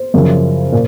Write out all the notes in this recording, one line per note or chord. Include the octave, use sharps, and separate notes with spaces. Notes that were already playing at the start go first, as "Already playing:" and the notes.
Already playing: C5
F#2 C#3 F3
A#2